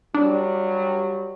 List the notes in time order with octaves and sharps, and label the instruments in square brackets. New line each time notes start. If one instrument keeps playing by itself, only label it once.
[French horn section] G2 F#3 G3 [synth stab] D4